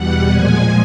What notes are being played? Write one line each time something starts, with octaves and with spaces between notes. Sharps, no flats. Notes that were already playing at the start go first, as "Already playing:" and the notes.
Already playing: E2 B2 G3 F#5
A#2 F3 G#3 G#5